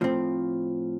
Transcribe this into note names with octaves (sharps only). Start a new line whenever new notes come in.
A2 F3 C4